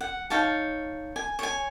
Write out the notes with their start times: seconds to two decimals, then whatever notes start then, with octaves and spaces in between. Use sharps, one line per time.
0.01 F#5
0.30 D#4 C#5 F5 A5
1.16 G#5
1.39 C#5 G#5